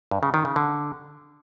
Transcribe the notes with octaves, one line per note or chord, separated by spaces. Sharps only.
G2
C#3
D#3
C#3
D3